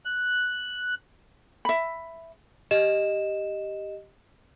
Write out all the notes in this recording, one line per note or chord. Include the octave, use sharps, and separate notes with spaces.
F#6
E5 B5
G4 D#5 E7